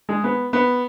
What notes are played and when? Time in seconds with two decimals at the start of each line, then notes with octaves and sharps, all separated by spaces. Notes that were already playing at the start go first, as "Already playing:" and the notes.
0.09 G#3
0.24 B3
0.53 B3